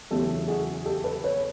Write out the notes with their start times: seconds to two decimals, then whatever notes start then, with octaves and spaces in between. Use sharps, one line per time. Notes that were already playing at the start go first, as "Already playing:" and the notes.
0.11 E2 C#3 F#3 A3 G4 A4
0.48 F#4 G#4
0.86 G4 A4
1.04 A4 B4
1.24 B4 C#5